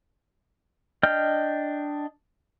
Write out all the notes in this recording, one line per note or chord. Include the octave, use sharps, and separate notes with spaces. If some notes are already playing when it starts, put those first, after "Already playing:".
D4 D#5 G5 F6 G6